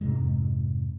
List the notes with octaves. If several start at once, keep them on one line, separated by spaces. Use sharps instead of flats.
F2 G#2 C3 G#3